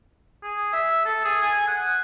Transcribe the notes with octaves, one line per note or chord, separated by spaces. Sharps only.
G#4
E5
A4
G#4
G#5
F#5